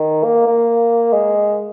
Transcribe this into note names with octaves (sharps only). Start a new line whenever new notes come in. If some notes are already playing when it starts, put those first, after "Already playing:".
Already playing: D#3
A#3
A#3
G#3